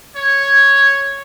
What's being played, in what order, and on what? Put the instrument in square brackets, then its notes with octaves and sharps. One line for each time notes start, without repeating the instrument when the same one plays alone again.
[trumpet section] C#5